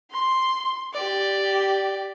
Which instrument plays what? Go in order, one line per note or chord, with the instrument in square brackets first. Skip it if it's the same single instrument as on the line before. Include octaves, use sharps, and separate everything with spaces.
[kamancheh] C6
G4 D5